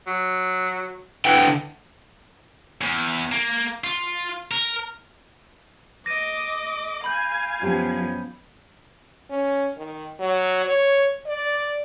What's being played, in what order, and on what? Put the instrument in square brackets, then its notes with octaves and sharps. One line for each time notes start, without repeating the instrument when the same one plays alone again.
[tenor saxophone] F#3
[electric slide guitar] D3 F#5 G5 [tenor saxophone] E3
[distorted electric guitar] E2
A#3
F4
A#4
[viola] D#5 D6 [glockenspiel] A#6 D#7
[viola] F5 G#5 [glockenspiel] B5 G6
[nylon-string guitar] F#2 G4 A5 [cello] F3 B3
[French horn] C#4
D#3
F#3
C#5
D5